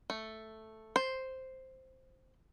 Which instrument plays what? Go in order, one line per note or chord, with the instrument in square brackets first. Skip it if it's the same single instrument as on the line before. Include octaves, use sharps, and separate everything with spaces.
[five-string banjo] A3
C5